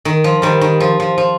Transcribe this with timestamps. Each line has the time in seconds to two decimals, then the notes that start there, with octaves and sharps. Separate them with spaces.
0.05 D#3
0.24 F3
0.42 D#3 G3
0.61 D#3
0.80 F3
1.00 F3
1.18 F3